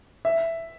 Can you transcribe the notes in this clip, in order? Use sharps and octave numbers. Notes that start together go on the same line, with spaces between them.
E5